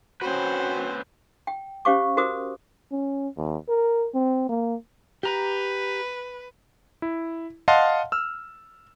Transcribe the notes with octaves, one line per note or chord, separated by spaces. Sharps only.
C4 C#4 F#4 B4 C5
G5
C#4 G4 C5 F5 C#6 D6
F#4 A#4 C5 D6 D#6
C#4
D#2
A#4
C4
A#3
G4 B4 A#5
E4
D#5 F5 F#5 A5 C6
E6 F6